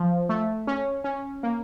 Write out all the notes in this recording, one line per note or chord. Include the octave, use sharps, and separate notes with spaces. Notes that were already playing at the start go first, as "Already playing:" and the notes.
Already playing: F3
A3
C#4
C#4
A#3